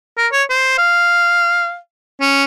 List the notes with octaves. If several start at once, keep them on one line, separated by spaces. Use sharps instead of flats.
A#4
C#5
C5
F5
C#4